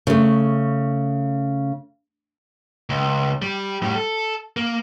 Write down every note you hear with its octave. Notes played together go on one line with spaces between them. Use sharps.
C#3 A3
C#2
G3
A2 G3
A4
A#3